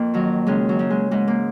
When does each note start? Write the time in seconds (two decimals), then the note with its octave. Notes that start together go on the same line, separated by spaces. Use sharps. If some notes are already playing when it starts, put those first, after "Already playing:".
Already playing: F2 A#3
0.14 D#3 F#3
0.47 C#3 G#3
0.69 F#3
0.79 C#3
0.90 G#3
1.11 G#2 G#3
1.28 A#3